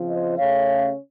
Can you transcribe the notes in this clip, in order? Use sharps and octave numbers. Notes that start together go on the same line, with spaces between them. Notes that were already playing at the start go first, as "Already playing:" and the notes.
Already playing: C#3 F3 C4 F4
C5 D#5
C#3 A3 C#4 C#5 F5